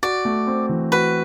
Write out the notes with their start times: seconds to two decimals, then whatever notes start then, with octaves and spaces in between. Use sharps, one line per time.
0.03 F#4 D5
0.25 A3
0.47 C4
0.69 E3
0.92 F#4 B4